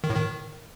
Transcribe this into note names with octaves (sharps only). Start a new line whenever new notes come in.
D#3
A2
D#3